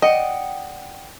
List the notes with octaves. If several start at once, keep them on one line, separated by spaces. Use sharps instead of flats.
D5 D#5 F#5 G5